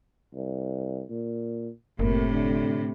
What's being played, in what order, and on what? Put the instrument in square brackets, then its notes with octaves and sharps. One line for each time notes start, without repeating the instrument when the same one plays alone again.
[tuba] C2
A#2
[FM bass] F#1 [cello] A2 C3 [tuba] A#3
[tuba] D3